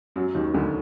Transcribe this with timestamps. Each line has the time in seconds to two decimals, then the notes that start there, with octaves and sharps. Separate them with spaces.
0.16 F#2 F#3
0.35 D#2 D#3
0.54 D2 D3